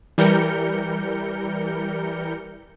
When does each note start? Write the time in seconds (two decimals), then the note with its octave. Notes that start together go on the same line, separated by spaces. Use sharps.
0.18 E3 G3 A#4 G6 C#7